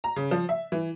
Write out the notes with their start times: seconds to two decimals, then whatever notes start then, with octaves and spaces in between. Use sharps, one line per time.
0.04 A#5
0.16 C#3
0.31 F3
0.49 E5
0.72 E3